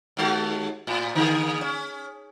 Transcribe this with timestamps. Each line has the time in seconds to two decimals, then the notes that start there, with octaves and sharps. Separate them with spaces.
0.17 D#2 G#3 F#4
0.87 A2
1.15 D3 A#3 G#4
1.61 C#4